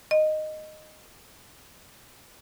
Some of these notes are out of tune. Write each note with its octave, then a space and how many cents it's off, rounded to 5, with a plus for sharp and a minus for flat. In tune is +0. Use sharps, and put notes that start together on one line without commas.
D#5 -10